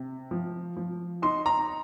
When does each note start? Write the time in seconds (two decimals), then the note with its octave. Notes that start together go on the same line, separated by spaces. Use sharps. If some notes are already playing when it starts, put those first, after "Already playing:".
Already playing: C3
0.31 F3
0.77 F3
1.22 D#4 C6
1.46 A#5